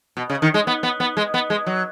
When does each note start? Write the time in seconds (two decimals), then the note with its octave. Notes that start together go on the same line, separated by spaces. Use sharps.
0.17 B2
0.30 C#3
0.42 D#3
0.54 G#3
0.67 B3
0.83 B3
1.00 B3
1.17 G#3
1.34 B3
1.50 G#3
1.66 F#3